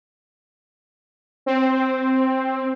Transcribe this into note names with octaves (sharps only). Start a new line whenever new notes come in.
C4